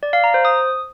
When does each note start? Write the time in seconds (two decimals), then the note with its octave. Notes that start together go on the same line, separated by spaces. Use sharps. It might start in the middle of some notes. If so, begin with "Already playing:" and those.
0.03 D5
0.13 F5
0.24 A#5
0.34 C5
0.45 D#6